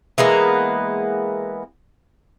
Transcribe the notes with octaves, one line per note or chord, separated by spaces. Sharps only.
E3 G#3 A#3 B3